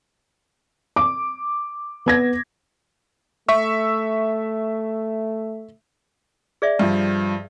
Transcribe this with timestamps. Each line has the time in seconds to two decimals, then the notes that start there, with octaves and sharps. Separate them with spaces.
0.96 D6
2.06 B3 G#6 A#6
3.48 A3 E5 C#6 E6
6.62 G#4 D5 E5
6.79 G2 F3